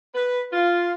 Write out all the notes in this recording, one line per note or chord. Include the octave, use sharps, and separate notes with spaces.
B4
F4